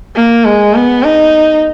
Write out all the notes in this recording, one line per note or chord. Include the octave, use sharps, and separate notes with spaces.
A#3
G#3
B3
D#4